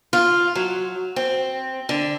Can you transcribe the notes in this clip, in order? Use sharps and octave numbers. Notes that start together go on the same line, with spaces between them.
F4
F#3
C4
D3